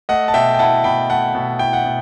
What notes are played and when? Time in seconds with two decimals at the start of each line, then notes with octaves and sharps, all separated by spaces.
0.09 A3 D#5 F#5
0.28 A5
0.34 B2 E5 G5
0.54 G5
0.59 E4 F#5 A5
0.84 B2 G5 B5
1.09 A3 F#5 A5
1.35 B2
1.59 E4 G5
1.73 F#5
1.85 B2